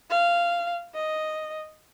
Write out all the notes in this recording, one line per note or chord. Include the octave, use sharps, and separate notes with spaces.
F5
D#5